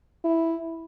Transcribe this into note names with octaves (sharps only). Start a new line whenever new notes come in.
E4